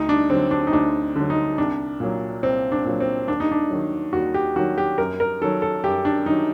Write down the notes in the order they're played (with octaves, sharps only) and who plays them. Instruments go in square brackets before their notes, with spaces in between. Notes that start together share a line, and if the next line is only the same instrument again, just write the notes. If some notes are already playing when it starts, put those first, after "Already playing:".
Already playing: [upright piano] D2 D#4
D4
D3 F#3 C4
D4
D#4
D2 D4
D3 F#3
D#4
C2 D4
A#2 F#3
C2 C4
D4
A#2 F#3
C4
D#2 D4
D#4
D4
D#3 F#3
D#2 F#4
G4
D#3 F#3 F#4
G4
F#2 A#4
A#4
D#3 F#3 A4
A4
F#2 G4
D4
D#3 F#3 D#4